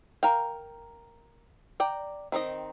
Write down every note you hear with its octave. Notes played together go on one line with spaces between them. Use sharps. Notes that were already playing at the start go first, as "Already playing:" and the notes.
A#4 F5 G5
D5 G5 A#5
D#3 C4 D#4 D#5